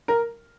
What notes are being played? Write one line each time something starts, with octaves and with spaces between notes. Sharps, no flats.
A#4